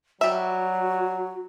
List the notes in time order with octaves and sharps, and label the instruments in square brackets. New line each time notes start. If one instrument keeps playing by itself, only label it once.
[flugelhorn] F#3 [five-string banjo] G3 E5 [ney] F#4